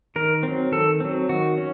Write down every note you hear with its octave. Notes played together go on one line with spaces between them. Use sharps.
D#3 A#4
F#3 C4
D#3 A4
F#3 C4
D#3 F#4
C#4